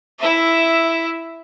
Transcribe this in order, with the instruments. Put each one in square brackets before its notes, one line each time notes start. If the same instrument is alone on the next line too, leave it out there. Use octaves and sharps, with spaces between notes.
[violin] E4 E5